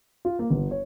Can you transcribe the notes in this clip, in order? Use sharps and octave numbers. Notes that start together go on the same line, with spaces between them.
F4
A#3
G1
C#5